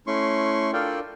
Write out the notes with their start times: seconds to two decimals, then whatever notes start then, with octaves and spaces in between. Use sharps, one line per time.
0.07 A3 C#4 E4 C6 C#6
0.73 D4 F4 A4 A#4 D5 G5